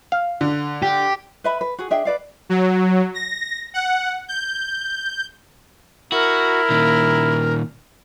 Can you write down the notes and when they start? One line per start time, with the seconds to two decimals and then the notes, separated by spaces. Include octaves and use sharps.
0.12 F5
0.41 D3
0.83 G4
1.44 B4 E5 B5
1.61 B4
1.79 F#4 G#4
1.91 D4 G#4 E5 G5
2.05 B4 D5 F5
2.49 F#3
3.14 A#6
3.74 F#5
4.28 G6
6.12 E4 F#4 A#4
6.70 A#2 D#3